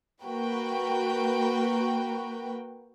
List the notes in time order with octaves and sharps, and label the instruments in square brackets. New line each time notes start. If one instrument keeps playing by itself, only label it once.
[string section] A#3 F#4 A#4 B4 G5